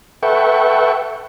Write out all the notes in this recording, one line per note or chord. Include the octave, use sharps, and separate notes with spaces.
A4 B4 E5 F#5 G5 C#6